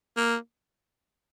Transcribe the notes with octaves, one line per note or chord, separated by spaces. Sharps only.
A#3